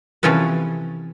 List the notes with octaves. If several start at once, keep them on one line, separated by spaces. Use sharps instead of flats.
C3 E3 F3 C#4 A4 B4